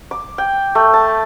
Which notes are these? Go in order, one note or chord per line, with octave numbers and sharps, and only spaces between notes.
D6
G5
A3
A5